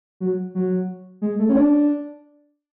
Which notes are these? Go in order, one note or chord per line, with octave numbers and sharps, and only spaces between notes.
F#3
F#3
G#3
A3
C#4
D4